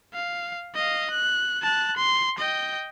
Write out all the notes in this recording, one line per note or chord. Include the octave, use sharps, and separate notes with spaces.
F5
D#5 F5
F#6
A5 F#6
C6
D#5 G5